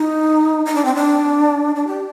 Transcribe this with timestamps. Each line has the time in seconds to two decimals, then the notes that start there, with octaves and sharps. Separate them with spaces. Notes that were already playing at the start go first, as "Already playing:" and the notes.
Already playing: D#4
0.65 D#4
0.75 D4
0.85 C4
0.95 D4
1.76 D4
1.87 G4